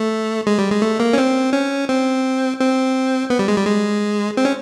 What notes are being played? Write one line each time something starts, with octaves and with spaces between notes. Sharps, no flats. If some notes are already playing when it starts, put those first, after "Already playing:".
Already playing: A3
G#3
G3
G#3
A3
A#3
C#4
C4
C#4
C4
C4
B3
G3
G#3
G3
G#3
C4
C#4